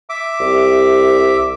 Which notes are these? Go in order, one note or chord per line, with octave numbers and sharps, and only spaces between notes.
E5 D6
C2